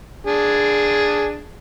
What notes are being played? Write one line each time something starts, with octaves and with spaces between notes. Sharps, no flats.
D4 G#4